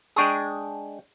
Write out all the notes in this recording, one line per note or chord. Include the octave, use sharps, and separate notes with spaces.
G#3 D4 G#4 G5 C#6 D#6